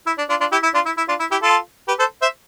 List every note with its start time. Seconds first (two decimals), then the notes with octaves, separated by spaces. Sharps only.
0.07 E4
0.18 D4
0.29 D4 F4
0.40 D4 F4
0.52 E4 G4
0.63 E4
0.74 D4 F4
0.86 E4
0.97 E4
1.08 D4 F4
1.20 E4
1.31 E4 G4
1.42 F4 A4
1.88 G4 B4
1.99 A4 C5
2.22 C5 E5